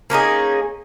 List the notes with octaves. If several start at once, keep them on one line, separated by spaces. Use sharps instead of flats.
A#3 C#4 D#4 G#4